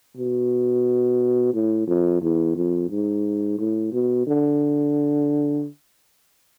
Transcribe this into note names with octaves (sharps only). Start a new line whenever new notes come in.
B2
A2
F2
E2
F2
G#2
A2
B2
D3